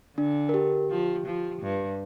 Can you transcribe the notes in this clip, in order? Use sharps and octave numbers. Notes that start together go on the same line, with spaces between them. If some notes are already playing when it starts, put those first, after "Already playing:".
D3 D4
A#4
G4
F3
F3
G2